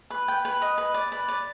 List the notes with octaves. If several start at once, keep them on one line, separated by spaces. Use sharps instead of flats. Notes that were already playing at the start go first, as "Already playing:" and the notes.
B4
G5
B4
D#5
B4
D5
B4
D5